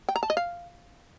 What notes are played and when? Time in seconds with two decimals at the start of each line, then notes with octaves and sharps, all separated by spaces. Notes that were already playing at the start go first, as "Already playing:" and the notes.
0.09 G5
0.16 A#5
0.23 A5
0.30 D#5
0.37 F5